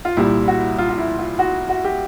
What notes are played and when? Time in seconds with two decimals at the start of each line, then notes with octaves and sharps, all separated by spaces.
0.05 F4
0.17 C2 A#2 G3 E4
0.48 F#4
0.78 F4
0.90 F4
0.98 E4
1.19 F4
1.39 F#4
1.69 F#4
1.84 G4